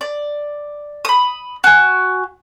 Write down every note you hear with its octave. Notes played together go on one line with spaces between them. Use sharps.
D5
B5 D#6
F#4 G#5